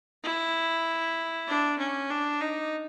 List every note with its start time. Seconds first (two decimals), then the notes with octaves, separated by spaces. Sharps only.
0.24 E4
1.48 D4
1.79 C#4
2.10 D4
2.41 D#4